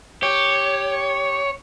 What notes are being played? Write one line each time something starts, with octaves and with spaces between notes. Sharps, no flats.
G4 C#5